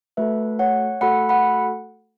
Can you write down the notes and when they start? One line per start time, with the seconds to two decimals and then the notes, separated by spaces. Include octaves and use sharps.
0.17 A3 F#4 A4 B4 E5
0.59 C#5 F#5
1.01 A3 F#4 A4 F#5 B5
1.29 F#5 B5